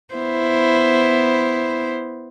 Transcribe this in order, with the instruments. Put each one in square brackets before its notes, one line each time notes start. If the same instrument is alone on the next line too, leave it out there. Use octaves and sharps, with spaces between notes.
[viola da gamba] B3 E4 C5